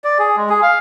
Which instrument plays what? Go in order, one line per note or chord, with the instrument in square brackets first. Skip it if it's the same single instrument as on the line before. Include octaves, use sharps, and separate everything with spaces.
[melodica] D5
G#4
G#3
G#4
F5